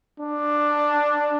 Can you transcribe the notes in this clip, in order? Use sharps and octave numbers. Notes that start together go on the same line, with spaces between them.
D4